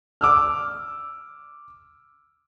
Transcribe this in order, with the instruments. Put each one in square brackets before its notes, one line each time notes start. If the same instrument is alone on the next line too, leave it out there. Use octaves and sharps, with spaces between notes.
[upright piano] D6 E6 F6